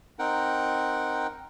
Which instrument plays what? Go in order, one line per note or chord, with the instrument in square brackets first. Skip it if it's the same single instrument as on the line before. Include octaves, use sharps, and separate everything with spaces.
[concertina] C4 D#4 A#4 F#5 G5